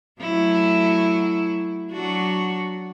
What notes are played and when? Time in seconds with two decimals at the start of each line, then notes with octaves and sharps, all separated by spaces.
0.21 F#3 A3 E4
1.92 F#3 D4 F#4